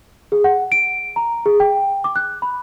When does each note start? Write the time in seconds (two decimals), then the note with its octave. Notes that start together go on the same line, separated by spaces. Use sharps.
0.32 G#4
0.44 F#5
0.72 D7
1.16 A#5
1.46 G#4
1.60 G5
2.04 D6
2.16 F#6
2.42 B5